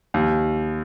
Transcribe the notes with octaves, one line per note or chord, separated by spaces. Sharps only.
D#2